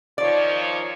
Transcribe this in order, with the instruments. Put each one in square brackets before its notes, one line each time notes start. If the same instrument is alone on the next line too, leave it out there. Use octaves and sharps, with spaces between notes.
[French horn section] D#3 F3 C#5 [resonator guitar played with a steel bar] D5